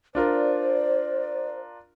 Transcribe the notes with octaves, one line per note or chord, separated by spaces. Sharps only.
D4 F4 A#4 C5 D5